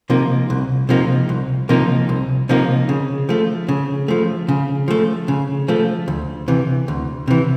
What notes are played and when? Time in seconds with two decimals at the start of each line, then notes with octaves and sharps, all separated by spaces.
0.10 C3 F3 A#3 D#4
0.50 C2
0.89 C3 F3 A#3 D#4
1.29 C2
1.69 C3 F3 A#3 D#4
2.09 C2
2.49 C3 F3 A#3 D#4
2.89 C#3
3.29 F3 A3
3.68 C#3
4.08 F3 A3
4.49 C#3
4.88 F3 A3
5.28 C#3
5.68 F3 A3
6.08 D2
6.48 C3 E3
6.88 D2
7.28 C3 E3